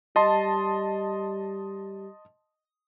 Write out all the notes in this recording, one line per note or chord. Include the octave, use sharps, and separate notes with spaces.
G3 D#5 A5 C6